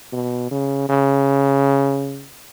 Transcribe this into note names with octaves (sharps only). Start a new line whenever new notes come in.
B2
C#3
C#3